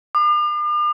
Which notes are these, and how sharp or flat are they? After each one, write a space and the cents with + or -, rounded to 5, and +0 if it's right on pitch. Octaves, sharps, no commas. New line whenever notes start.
D6 +45